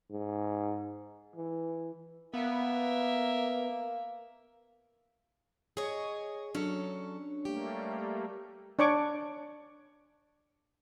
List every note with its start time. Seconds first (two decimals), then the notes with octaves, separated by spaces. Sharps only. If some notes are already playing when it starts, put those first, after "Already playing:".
0.11 G#2
1.36 E3
2.34 A#3 B3 A#4 E5
5.77 G#4 C#5 D#5
6.55 F#3 C#4 D4 A4
7.45 G3 A3 A#3 G4
8.79 D4 C#5 C#6 D6